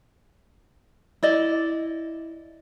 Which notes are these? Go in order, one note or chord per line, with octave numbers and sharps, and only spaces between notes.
E4 D5 D#5